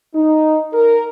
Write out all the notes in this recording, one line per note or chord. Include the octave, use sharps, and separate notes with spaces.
D#4
A#4